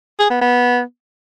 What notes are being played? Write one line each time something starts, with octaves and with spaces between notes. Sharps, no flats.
G#4
B3
B3